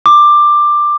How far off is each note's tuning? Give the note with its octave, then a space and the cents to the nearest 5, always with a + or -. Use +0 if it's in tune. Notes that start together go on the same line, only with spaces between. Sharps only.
D6 +15